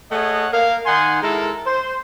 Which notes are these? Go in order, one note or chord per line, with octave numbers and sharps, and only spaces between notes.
A3 G#4 C#5 D#5 F#5
A#3 A#4 F5
D#3 D#4 F#5 G#5 C6
G#3 E4 A4 A#4
C5